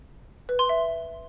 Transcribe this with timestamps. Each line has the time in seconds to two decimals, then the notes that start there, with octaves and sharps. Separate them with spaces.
0.49 B4
0.59 C6
0.69 E5